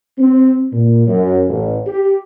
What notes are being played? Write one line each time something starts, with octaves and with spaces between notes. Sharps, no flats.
C4
A#2
F#2
A1
G4